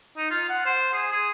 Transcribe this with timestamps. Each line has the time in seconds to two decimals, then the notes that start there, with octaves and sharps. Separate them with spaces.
0.17 D#4
0.31 F4
0.49 F#5
0.66 C5
0.94 G#4
1.12 G#4